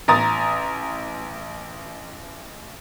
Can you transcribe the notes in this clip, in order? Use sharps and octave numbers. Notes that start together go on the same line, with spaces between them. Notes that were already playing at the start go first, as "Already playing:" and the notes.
A1 A#5 D#6 A6